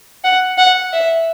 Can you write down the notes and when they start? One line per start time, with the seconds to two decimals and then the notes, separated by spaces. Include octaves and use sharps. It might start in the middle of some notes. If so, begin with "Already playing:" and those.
0.24 F#5
0.58 F#5
0.93 E5